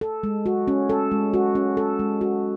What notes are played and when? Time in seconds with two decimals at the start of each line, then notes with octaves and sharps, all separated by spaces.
0.01 A4
0.23 G#3
0.46 F#4
0.68 C#4
0.90 A4
1.11 G#3
1.34 F#4
1.55 C#4
1.77 A4
1.99 G#3
2.21 F#4